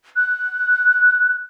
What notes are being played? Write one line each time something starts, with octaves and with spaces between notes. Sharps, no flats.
F#6